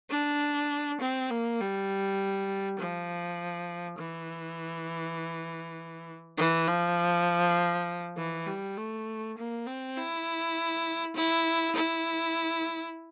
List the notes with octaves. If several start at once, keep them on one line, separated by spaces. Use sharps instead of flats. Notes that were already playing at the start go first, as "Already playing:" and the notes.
D4
C4
A#3
G3
F3
E3
E3
F3
E3
G3
A3
A#3
C4
E4
E4
E4